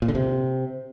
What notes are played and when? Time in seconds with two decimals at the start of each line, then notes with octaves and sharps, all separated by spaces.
0.02 A#2
0.08 D3
0.15 C3